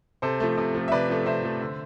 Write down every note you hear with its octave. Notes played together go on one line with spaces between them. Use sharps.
C3 A4 C5
F3 A3
C3
F3 A3
E5
C3 B4 D5
F3 A3
C3 C5 E5
F3 A3
D3